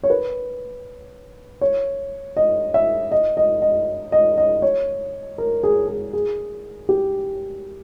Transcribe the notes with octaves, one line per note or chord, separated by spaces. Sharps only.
C#5
B4
C#5
D#5
E5
D#5
D#5
D#5
D#5
D#5
C#5
A#4
G#4
G#4
G#4
G4